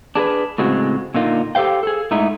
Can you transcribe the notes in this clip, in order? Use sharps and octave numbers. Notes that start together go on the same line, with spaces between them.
D4 G#4 A#4 B4
A2 C#3 G#3 C4 F#4
A#2 D3 A#3 D#4 F4
G4 A4 C5 F5 G5
G#4 A4
G#2 A3 D#4 E4